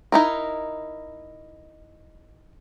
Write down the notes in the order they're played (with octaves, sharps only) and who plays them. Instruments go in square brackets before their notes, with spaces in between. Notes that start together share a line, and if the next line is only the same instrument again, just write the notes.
[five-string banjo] D#4 E4 A#4